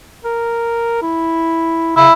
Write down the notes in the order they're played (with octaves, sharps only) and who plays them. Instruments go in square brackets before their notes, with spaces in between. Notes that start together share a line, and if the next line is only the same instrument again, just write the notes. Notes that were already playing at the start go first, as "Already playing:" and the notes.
[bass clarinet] A#4
E4
[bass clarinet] C#3 [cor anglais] E4